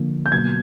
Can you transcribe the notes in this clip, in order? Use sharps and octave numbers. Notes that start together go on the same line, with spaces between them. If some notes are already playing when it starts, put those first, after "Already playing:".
Already playing: D3 F3 A#3
G6
B2 F#3 A#3 G#6